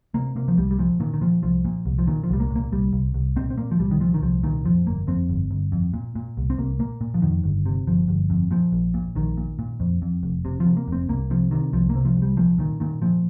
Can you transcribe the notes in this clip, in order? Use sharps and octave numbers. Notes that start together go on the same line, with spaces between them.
C3 A#3
C3 A#3
F3
C2 G3
G3
A#2 F3
A#2 D#3
D#3
A#2 F3
C2 F3
A#2
C2
F3
A#2 D#3
F3
C2 G3
A#3
A#2
A#3
C2 G3
C2
C2
A#2 C4
C4
A#2 A#3
F3
C2 G3
D#3
A#2 F3
D#3
C2 F3
A#2 D#3
F2 F3
G1 A#3
F2 C4
G1
G1
F2
A#2
A#2
C2
C4
C2 A#3
A#2 A#3
A#2
F3
F2 D#3
G1
C3
G1 F3
G1
F2
A#2 F3
A#1
A#2
A#1 D#3
A#2
A#2
F2
F2
F1
C3
F3
C3
A#3
F1 C4
C2 A#3
C3 F3
C3 D#3
C2 F3
A#3
C3
F3
C2
G3
A#2 F3
A#2 D#3
A#2 D#3
A#2 F3